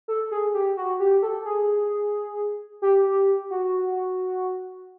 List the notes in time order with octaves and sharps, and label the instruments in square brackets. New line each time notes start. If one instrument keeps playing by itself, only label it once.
[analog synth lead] A4
G#4
G4
F#4
G4
A4
G#4
G4
F#4